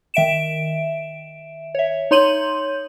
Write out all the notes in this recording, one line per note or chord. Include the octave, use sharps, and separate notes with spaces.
D#3 E5 D7 E7
C#5 E5
D#4 C#5 C6 G6 D#7 F#7